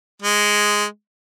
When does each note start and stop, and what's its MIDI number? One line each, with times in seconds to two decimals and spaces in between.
0.22 0.84 56